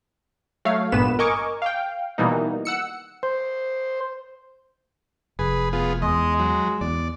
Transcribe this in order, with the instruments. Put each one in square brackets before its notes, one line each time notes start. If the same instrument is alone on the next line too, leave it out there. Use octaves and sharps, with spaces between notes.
[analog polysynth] F#3 A3 C#5 F5
G#1 G2 A#2 B3 B4 E7
A#4 D#5 G#5 C#6 D6
F5 G5
B2 D#3 E3 G3 A#3 D#4
F#5 E6 C#7
[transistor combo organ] C5
[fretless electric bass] F1 [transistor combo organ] G#4 B4
[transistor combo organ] B3 F4 G#4
[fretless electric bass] E2 [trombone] G#3 [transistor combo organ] D#5
[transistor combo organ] F#3
[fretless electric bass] E2 [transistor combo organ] D5